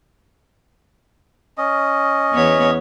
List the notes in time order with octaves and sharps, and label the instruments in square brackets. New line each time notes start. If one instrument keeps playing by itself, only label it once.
[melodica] C#4 D#5
[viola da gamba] E2 B3 C#5